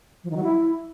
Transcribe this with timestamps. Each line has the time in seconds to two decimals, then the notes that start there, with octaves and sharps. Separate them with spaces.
0.24 F3
0.30 D#3
0.37 F#3
0.43 E4